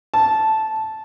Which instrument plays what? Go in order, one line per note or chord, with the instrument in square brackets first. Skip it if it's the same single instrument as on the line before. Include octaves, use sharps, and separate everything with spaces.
[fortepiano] A5